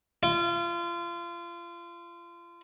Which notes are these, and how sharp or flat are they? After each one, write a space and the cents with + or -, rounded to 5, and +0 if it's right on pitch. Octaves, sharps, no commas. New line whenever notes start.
F4 -30